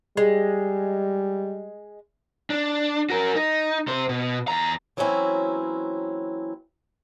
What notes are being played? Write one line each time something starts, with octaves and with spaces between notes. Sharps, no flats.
G3 G#3
D4
F#4 A#4
D#4
C3 C5
B2
E2 A#5
E3 F#3 A#3 C4 C#4 E4